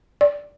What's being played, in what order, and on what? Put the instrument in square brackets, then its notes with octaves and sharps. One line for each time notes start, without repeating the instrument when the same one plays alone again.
[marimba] D5